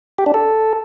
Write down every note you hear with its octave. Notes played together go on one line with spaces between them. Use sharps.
G4
D4
A4